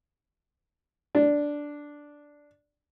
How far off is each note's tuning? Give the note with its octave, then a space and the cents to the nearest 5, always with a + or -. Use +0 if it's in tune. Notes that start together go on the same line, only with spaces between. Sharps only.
D4 -5